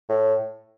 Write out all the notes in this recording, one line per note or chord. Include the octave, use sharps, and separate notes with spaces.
A2